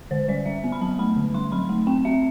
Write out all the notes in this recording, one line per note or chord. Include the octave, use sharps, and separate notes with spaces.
D3 C5
G3 D5
G3 E5
B3
B5
F#3 A5
A3 B5
D3
G3 C6
F#3 B5
A3
C4 G5
C4 E5